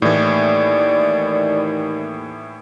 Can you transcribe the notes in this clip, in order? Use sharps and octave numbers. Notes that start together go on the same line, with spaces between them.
D#2 A2 E3 D5